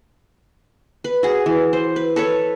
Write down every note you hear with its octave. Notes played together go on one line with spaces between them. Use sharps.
B4
F#4 G#4
E3
C5
B4
A4 B4 C#5